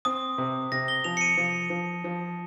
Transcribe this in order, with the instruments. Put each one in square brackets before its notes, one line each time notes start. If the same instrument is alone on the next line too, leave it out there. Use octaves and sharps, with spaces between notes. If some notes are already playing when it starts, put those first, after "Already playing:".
[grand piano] C4 [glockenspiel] D#6
[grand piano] C3
[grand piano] C3 [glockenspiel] A#6
[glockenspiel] G7
[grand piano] F3 [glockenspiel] F7
[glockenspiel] C#7
D#7
[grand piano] F3
F3
F3